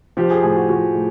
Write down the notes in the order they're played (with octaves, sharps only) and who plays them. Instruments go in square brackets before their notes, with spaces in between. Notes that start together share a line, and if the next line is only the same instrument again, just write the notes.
[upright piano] F3 G4
G#4
A2 G#4
F#4
F3 F#4
A2